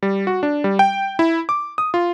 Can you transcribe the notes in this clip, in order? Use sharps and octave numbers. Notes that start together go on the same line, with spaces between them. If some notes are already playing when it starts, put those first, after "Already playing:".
G3
F#4
D4
G3
G5
E4
D6
D#6
F4